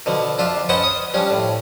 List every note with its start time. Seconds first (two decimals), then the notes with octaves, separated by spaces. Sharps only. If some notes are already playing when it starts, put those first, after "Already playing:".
0.06 B2 D3 F3
0.38 F2 D4 F4 E5
0.69 C#4 B4 C5 D#5 F#5 A5
0.83 D#6
1.14 F3 G3 C#4 D4
1.30 A2